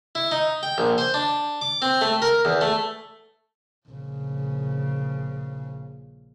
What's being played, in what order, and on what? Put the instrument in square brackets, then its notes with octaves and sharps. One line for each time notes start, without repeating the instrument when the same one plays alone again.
[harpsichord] E4
D#4
G5
A#1
C5
D4
D6
C4
A3
A#4
E2
A3
[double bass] A#1 C#3